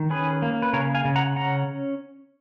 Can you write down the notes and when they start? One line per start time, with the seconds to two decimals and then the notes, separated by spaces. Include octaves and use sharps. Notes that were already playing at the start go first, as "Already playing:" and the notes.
Already playing: D#3
0.10 C#4 G#4 B4
0.42 A#3
0.62 B4
0.73 C#3 A#4 C#5
0.95 F5 G#5
1.05 C#3
1.16 F#5 A#5
1.36 C#4 F#5 A#5